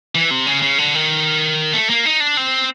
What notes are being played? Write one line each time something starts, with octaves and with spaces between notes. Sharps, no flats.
E3
C3
C#3
C#3
D3
D#3
A3
A#3
D#4
D4
C4